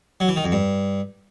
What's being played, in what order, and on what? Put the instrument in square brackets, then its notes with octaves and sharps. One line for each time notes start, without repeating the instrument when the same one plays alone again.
[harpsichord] F#3
E3
D#3
F2
G2